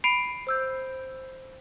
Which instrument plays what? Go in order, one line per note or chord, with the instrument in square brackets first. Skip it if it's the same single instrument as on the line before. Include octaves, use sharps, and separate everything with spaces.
[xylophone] B5 C7 D7 D#7 F7
C5 E6 G6